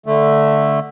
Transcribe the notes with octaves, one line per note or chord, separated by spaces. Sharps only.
D3 A3